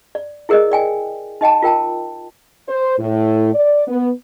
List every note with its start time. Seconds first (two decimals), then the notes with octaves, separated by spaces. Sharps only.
0.15 D5
0.49 E4 G#4 A#4 D5 D#5
0.72 D5 G5 G#5
1.41 D#4 D#5 G5 A5
1.62 F4 A#4 G5 A5
2.69 C5
2.99 A2
3.54 D5
3.88 B3